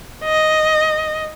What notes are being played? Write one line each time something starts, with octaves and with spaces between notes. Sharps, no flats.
D#5